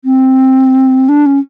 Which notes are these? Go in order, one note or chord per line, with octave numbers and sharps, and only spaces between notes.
C4
D4
C#4